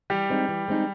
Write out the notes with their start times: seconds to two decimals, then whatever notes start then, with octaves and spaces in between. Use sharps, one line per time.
0.10 E3 G3 G4
0.30 G#3 C4 D#4 G#4
0.49 E3
0.68 G#3 C4 D#4 G#4